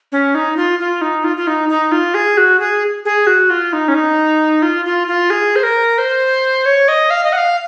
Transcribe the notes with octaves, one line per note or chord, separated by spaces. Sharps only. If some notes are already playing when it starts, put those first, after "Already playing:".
C#4
D#4
F4
F4
D#4
F4
F4
D#4
D#4
F4
G#4
F#4
G#4
G#4
F#4
F4
D#4
C#4
D#4
F4
F4
F4
G#4
C5
A#4
C5
C#5
D#5
F5
D#5
F#5
F5